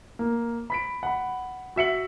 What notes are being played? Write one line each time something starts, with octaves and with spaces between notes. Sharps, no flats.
A#3
B5 B6 D7
F#5 B5
F#4 E5 C#7 F#7